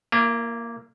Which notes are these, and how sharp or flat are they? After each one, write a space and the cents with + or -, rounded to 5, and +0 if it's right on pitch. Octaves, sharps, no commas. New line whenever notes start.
A#3 +0 E4 +45